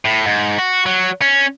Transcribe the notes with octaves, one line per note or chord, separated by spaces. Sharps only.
A2
G#2
F#4
F#3
C#4